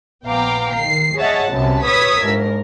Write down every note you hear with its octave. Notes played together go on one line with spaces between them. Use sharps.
A#1 B3 F5 G5 A#5 D6
D#3 C7
G#4 C#5 D#5 E5 F#5 A5
C2 F#2 C3 B3 A5
B4 C#5 D#6 E6 G#6 B6
G1 G#2 A#4